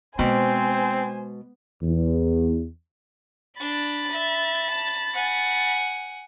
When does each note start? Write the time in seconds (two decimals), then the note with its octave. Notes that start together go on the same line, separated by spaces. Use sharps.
0.19 B2 G#3 C4 C5 G#5
1.82 E2
3.60 D4 B5 A6
4.11 E5
4.70 A5
5.14 F#5 G#5